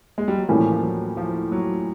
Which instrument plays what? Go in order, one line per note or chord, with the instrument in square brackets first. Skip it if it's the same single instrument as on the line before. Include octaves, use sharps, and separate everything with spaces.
[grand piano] G#3
G3
F#3
[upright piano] A2 E3 G3 A#3 C#4 [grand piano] F3
[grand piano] F3
F#3
F3
F#3